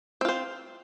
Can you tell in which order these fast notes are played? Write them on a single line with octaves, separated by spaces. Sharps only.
C4 F4 C5